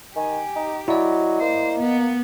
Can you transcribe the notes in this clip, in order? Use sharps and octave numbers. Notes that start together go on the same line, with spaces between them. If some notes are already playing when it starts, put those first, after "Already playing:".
D#3 G4 G#5
D#4
F#3 E4 D5 D#5
A#3 C5
B3